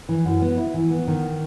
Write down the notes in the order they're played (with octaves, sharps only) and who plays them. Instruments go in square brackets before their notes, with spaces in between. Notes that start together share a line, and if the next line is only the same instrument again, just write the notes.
[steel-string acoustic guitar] E3
F#2
B3
E4
E3
B3
D#3